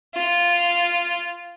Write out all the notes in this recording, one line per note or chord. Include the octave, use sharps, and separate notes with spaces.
F4